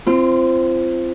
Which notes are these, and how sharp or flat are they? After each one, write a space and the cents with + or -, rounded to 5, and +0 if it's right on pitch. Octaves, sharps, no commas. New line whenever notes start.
C4 +0 F4 -35